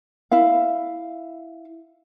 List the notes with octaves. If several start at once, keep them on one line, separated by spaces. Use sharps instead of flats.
E4 E5 F5